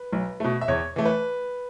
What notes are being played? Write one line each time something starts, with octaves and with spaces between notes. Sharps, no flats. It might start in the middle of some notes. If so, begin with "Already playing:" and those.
Already playing: B4
B1
B2 A3
E5
E2 C#5
E3 A3
B4